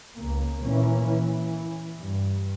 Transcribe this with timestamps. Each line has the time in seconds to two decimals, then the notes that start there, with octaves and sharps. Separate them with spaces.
0.16 C#2 C#3 A#3
0.63 A#2 E3 A#3 C#4
1.08 E3
1.99 G2